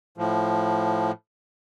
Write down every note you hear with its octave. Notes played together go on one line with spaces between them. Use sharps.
A2 F3